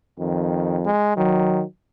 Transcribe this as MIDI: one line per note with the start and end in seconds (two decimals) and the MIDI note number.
0.20 0.88 41
0.20 0.79 51
0.85 1.15 56
1.17 1.63 51
1.17 1.63 54